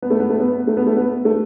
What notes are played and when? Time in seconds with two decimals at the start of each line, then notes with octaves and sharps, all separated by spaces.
0.02 B3
0.10 A3
0.20 B3
0.30 A3
0.40 B3
0.67 A3
0.77 B3
0.87 A3
0.97 B3
1.25 A3